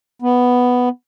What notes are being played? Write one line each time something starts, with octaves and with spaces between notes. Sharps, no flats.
B3